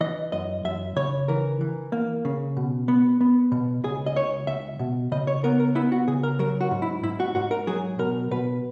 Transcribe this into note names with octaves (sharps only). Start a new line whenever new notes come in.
E3 D#5
F#2 D#5
F#2 E5
C#3 C#5
E3 A#4
E3
A#3
C#3
B2
B3
B3
B2
C#2 G#4
D#5
C#2 C#5
C#2 E5
B2
C#3 D#5
C#5
B3 A#4
A#4
B3 E4
F#4
C#3 G#4
A#4
F#3 A#4
F#4
G#2
E4
G#2 E4
F#4
G#2 F#4
A#4
F#3 G#4
B2 A#4
B2 B4